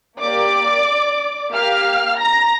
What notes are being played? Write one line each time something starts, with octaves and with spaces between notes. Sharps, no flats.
A#3 G4 D5 D6
A#3 G4 F5 F6
A#5 A#6